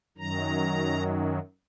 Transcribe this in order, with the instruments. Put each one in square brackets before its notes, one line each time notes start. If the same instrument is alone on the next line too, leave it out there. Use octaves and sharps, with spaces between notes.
[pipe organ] F#2 D#3 F#3 A#5